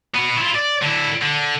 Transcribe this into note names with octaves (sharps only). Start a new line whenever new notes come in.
B3 F#4
E4 F4
D5
D3 E4
D3